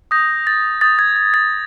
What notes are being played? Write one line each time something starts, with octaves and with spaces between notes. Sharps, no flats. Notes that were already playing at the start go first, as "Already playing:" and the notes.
D#6 G6 A#6
A6
D#6 G6 A6
G#6
G#6
A6